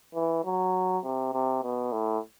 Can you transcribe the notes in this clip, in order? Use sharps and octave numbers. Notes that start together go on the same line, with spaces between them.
E3
F#3
C3
C3
B2
A2